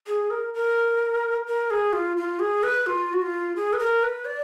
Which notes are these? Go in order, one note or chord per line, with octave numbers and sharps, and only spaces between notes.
G#4
A#4
A#4
A#4
G#4
F4
F4
G#4
B4
F4
F#4
F4
G#4
B4
A#4
B4
D5